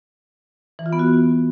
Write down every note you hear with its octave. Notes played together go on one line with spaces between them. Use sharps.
E3
F4
B3
F#4